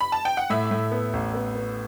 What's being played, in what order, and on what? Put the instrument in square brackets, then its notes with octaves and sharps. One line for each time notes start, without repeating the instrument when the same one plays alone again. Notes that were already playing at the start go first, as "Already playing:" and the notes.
[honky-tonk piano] B5
A5
G5
F#5
[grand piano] A2 [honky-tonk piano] E5
[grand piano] A2
B3
A1
B3
B3